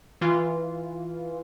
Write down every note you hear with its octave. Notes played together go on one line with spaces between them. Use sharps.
E3 F4